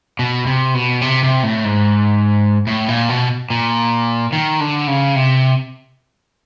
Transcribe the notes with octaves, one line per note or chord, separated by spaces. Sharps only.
B2
C3
B2
C3
C3
A2
G#2
A2
A#2
B2
A#2
D#3
D3
C#3
C3